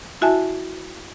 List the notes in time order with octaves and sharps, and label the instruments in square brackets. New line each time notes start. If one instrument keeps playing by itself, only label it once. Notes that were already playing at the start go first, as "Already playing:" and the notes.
[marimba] E4 F#4 E5 G#5 A5